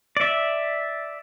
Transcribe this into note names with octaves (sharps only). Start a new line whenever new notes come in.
D5 E5